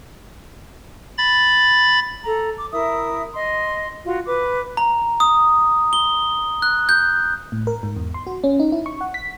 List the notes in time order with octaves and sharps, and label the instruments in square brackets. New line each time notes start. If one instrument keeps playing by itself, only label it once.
[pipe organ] B5 A6
[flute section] A4 A#5
D6
E4 A#4 E5 D#6
D#5 C6
F4 F#4
B4 D6
[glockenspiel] A#5
D#6
G7
F#6
G6
[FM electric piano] A2
A#4
G#2
E2
C6
F#4
C#4
D#4
E4
C#6
F#5
B6